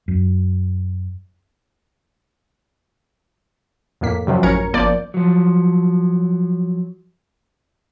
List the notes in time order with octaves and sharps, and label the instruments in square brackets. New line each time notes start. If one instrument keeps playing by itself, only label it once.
[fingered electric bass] F#2
[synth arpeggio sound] F2 A2 A#3 B6
F#2 C3 F3 F#3
A1 C#4 A#4 A#5 G#6 C#7
G1 F3 A#3 D5 G6
[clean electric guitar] F3 F#3